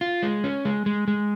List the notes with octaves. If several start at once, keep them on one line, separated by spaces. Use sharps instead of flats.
F4
G#3
C#4
G#3
G#3
G#3